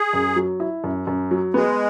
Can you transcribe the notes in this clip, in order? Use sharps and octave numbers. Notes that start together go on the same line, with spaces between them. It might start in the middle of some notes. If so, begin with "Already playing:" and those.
Already playing: G#4
F#2
F#3
E4
F#2
F#2
F#3
G#3 B3